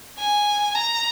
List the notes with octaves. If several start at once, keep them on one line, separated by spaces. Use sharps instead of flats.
G#5
A#5